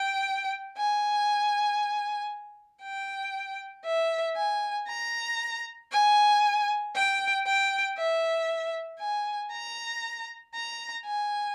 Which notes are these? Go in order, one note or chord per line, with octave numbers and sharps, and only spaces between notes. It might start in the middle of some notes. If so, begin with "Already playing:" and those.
Already playing: G5
G#5
G5
E5
G#5
A#5
G#5
G5
G5
E5
G#5
A#5
A#5
G#5